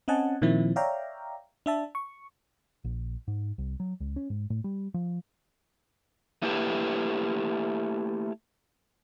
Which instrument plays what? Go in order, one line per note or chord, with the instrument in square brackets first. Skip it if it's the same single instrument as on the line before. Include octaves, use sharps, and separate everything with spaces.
[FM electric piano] C4 C#4 D#5 F#5 G#5 A5
A#2 D#3 F3 C4 E4
C#5 D5 E5 F5 G5 A#5
D4 E5 A5
C#6
[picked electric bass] A#1
G#2
C2
F#3
C#2
C#4
G#2
A2
G3
F3
[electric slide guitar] A3 A#3 E4 G4 B4